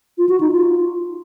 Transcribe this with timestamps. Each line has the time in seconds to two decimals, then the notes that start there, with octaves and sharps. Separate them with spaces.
0.18 F4
0.29 F#4
0.40 D#4
0.52 F4